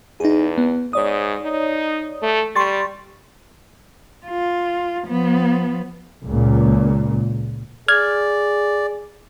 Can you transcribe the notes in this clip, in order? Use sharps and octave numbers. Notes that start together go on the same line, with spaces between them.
E2 D#4 G#4
B3
G#2 C#5 D5 D#6
D#4
A3
G3 C6 C#6 A6
F4
F3 B3
C#2 A#2
G#4 D5 F6 G#6